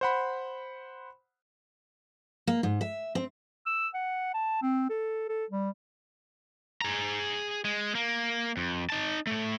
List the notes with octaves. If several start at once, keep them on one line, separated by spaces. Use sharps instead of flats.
C5 F#5 B5
A#3
G#2
E5
C4
E6
F#5
A5
C4
A4
A4
G3
G#4 A#5
G#3
A#3
F2
D#4 A5
A2 A3